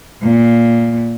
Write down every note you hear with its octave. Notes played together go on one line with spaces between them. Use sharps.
A#2